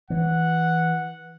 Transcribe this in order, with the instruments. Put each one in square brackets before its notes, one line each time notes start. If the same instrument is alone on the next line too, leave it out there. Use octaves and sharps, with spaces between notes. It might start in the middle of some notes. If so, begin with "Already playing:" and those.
[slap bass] E3 [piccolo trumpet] F#5